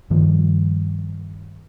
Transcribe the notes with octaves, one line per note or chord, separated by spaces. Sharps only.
G2 D#3 F3